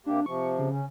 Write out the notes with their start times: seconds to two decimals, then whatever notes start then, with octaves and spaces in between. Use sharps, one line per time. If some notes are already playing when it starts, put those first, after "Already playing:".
0.06 C3 A#3 D4 G4
0.26 C3 F3 C#6
0.59 C#3
0.70 C#4